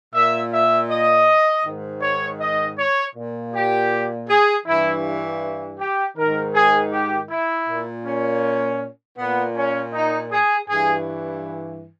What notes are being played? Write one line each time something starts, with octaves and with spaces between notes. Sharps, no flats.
A#2 E5
E5
D#5
G#2 D#3
C#5
D#5
C#5
A#2
G4
G#4
G2 E3 E4
G4
G#2 D#3 A#4
G#4
G4
E4
A#2
C#4
A#2 B3
C#4
D#4
G#4
G2 E3 G#4